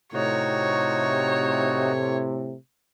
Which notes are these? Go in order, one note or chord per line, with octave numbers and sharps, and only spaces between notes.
A2 C3 D#4 F#4 C#5